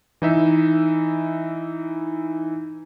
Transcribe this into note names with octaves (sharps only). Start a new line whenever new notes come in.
E3 D#4 E5